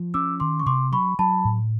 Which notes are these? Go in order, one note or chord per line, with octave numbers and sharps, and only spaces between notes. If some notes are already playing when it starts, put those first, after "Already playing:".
Already playing: F3
C#4 D6 E6
D#3 C6 D6
C#6
C3 C6 D6
F#3 B5 C#6
F#3 A5 B5
A2